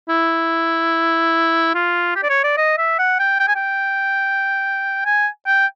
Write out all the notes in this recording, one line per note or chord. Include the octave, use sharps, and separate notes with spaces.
E4
F4
G4
D5
C#5
D5
D#5
E5
F#5
G5
G5
G#5
G5
G#5
G5